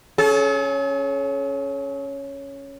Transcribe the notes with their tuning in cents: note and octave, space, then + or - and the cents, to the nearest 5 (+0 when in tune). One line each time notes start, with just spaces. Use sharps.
C#4 +0 A4 -45